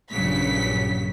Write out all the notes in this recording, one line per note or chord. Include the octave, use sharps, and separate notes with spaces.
A#1 G2 C#3 F#3 B6